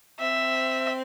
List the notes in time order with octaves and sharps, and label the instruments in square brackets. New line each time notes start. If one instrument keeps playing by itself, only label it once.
[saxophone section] C4 [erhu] E5